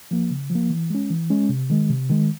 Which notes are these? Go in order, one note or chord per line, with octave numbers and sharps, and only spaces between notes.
F3 A#3
C#3
F3
A#3
E3
G#3 C#4
E3
G#3 C#4
C3
D#3 G#3
C3
D#3 G#3